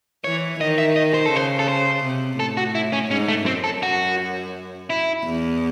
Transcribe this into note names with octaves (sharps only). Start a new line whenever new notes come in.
E3 C#5
D#3 D#5
E5
D#5
C5
A4
C#3 C5
A4
C5
C3
A2 A4
F#4
E4
C#4
G#2 C#4
A3
F#2 C4
A4
F#4
E4
E2